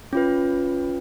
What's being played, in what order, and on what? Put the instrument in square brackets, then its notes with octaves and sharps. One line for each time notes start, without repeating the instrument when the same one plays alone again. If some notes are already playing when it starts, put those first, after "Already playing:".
[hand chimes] C#4 F4 B4